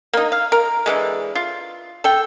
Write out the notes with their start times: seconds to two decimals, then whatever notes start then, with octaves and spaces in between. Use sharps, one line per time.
0.13 A#3 D#4
0.32 F5
0.52 A#4
0.86 D3 E3 G#3
1.35 F4
2.04 A4 G5